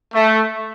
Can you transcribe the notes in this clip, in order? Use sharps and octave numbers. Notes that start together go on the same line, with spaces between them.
A3